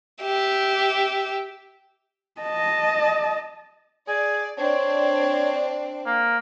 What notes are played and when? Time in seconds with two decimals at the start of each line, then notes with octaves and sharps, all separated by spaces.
0.22 G4 E5
2.41 D#5 A5
4.08 G#4 D5
4.58 C4 D4 C#5 D5
6.06 A#3